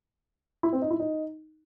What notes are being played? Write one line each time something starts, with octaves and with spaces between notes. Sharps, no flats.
E4
C4
D#4
E4
D#4